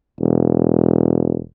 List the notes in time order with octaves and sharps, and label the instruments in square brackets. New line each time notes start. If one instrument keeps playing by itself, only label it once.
[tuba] E1